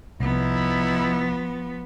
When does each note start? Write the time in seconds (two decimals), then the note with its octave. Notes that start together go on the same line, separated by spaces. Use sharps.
0.20 C2 F3 B3 D#4 E4